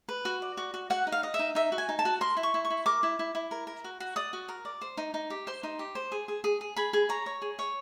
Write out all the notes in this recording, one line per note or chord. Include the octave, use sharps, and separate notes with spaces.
B4
F#4
D5
F#4
F#4
F#4 F#5
D#4
F5
D#5
E5
D#4
D#4 E5
F#4
G#5
D#4
A5
F#4
A#4 C6
E4
C#6
E4
C#6
E4
A#4 D6
E4
E4
E4
A#4
A#4
F#4
F#4
D5 D#6
F#4
A#4
D5
C5
D#4
D#4
G4
C5 C6
D#4
G4
C5
G#4
G#4
G#4
G#4
G#4 B5
G#4
C#5 A#5
C#5
G#4
C#5